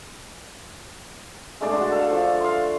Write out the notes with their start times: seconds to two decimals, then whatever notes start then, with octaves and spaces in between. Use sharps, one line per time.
1.61 G#3 A3 D4 D5
1.73 D3 F#4
1.92 A4 F5
2.10 F3 D4
2.41 F5 C6